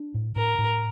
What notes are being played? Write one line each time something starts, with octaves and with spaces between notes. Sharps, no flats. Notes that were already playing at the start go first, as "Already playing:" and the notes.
Already playing: D4
A2
A2 A#4
A2